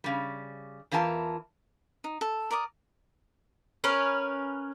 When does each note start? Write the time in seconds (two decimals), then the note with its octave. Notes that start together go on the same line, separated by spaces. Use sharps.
0.04 C#3 G3
0.91 E2 E3 F4 A#4 G#5 A5
2.04 D#4
2.21 A4
2.51 A#4 D5 D6 D#6
3.84 C#4 A#4 B4 C#5